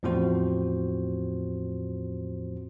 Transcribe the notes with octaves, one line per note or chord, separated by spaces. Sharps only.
E2 A2 F3 C4 F#4 C5